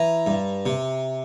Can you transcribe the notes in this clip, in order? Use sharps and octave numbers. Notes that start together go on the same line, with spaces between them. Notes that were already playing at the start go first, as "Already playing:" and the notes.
Already playing: E3 A#5
G2
C3